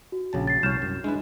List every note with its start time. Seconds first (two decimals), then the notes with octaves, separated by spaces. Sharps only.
0.12 F#4
0.33 A#1 C#3 A5
0.47 A6 C7
0.63 C2 C#5 F6 G6 E7
0.82 F#2
1.04 G#3 D4 E4 B4